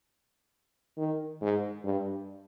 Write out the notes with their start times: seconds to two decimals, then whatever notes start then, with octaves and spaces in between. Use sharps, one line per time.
0.98 D#3
1.42 G#2
1.84 G2